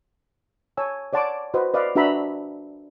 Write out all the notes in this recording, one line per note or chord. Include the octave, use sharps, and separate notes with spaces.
C#5 G#5 A5 E6
C#5 D5 F#5 A5 C6 D6
F#4 B4 C5 D#5
B4 D5 D#5 F5
D4 F#4 B4 E5 A#5 B5